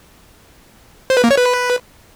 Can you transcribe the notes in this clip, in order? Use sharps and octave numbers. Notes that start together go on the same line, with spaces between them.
C5
B4
A#3
C#5
B4